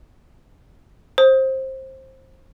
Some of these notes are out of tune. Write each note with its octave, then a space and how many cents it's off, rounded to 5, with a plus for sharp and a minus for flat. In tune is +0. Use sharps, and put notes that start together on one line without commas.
C5 +20 D#6 +25